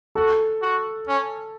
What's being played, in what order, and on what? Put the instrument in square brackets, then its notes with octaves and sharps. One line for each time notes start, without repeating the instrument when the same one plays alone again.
[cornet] F#4 [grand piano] A4
[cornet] F#4
C#4